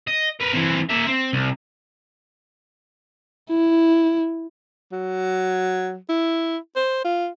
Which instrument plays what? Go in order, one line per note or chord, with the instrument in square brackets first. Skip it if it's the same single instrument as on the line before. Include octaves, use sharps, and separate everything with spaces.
[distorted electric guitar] D#5
A#4 B4
E3 C4
A#3 E5
C4
C2
[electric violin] E4
[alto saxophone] F#3
E4
C5
F4